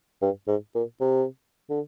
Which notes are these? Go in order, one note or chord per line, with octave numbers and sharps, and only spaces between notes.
G2
G#2
A#2
C3
D3